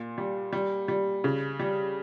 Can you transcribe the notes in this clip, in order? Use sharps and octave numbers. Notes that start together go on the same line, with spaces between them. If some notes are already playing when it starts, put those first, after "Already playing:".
Already playing: A#2
G3
G3
G3
C#3
G3